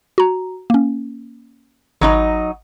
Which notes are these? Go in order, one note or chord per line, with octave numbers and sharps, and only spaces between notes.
F#4 A#5
A#3 C#4
G#1 F#3 D#4 D#5 B5